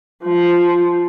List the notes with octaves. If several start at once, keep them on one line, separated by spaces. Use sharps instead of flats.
F3